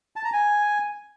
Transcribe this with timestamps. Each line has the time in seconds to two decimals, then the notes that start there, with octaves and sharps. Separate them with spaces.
0.16 A5
0.25 A#5
0.33 G#5